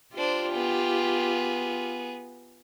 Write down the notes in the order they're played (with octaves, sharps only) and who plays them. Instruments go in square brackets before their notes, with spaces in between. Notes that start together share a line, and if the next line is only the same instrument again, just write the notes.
[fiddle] D4 C5 [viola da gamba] F4 G4
[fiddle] B3 G#4